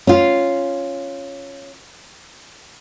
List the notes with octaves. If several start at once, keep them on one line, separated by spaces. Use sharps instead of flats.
C#4 F4